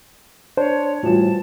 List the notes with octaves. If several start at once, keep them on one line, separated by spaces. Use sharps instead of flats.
D4 C5 C#5
A2 E3 G3 F4 F#4 A5